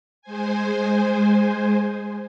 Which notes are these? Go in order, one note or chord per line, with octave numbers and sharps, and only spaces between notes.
G#3 C5 G#5